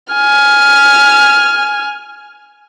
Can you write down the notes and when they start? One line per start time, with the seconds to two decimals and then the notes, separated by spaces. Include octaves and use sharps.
0.13 G#5 F6